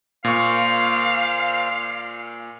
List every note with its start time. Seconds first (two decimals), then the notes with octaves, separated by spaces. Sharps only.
0.24 A#2 A#3 F4 C5 F5 C#6